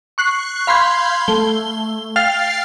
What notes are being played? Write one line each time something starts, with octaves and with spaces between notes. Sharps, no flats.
C#6 F#6 C7
F5 B5 C6 F6 G6 G#6
A3 G7
F5 G5 F6 A6 C7